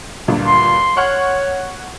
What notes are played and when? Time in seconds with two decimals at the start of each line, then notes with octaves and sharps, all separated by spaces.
0.28 D2 G2 A#2
0.47 C6
0.97 C#5 F#5 C#6 F6